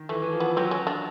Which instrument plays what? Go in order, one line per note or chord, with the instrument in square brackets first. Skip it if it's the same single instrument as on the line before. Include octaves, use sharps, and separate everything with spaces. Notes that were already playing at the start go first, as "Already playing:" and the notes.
Already playing: [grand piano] D#3
[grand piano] E3 [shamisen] A3
[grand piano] E3
F3
[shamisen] B3
[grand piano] F#3 [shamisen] C4
[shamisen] C#4
D4